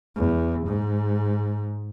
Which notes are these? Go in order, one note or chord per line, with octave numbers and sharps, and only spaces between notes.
E2
G#2